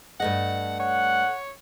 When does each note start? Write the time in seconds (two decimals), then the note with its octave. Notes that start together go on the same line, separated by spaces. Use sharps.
0.20 G2 A3 D#5 F#5
0.80 C#5 F#5